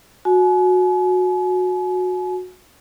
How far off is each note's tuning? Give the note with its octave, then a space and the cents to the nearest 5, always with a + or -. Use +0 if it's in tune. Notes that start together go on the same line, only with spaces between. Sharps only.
F#4 -20 G#5 +40